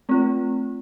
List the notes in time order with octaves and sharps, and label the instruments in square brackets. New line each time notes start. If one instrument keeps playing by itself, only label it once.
[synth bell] A3 C4 F4